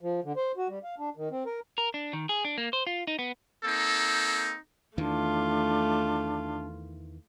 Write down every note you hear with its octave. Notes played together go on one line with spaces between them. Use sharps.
F3
D3
C5
F#4
G3
F5
D4
D#3
C4
A#4
A#4
D4
D#3
G#4
D4
A#3
C5
F4
D#4
B3
A#3 C4 D#4 A4
E2 D#3 E3 A3 D4 F4